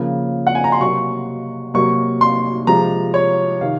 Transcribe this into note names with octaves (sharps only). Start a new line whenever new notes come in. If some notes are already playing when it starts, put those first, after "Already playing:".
Already playing: C#3 F3 A#3
F#5
G#5
A#5
C6
C3 F#3 A#3 C#6
C3 F#3 A#3 C#6
C6
C3 F3 G#3 A#5
C#5
C3 D#3 F5